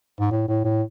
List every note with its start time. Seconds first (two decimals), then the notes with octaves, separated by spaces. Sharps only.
0.20 G#2
0.31 A2
0.48 A2
0.65 A2